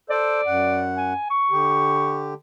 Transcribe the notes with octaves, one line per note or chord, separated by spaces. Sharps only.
A4 C5 D5
F#2 F#5
G#5
C#6
D3 G4